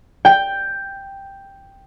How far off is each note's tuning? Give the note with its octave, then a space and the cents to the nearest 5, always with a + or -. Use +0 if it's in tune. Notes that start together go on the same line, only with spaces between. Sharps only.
G5 +5